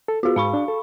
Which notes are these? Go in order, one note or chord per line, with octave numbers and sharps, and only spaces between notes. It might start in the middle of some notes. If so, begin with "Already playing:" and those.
A4
B3 F4 F#4 G#4
G#2 F5 B5 C#6
D4
A4